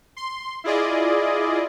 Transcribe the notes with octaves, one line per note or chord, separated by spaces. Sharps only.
C6
E4 F4 G#4 D5 D#5